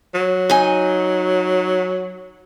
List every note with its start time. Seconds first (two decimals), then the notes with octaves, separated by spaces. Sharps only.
0.14 F#3
0.50 D#4 G#5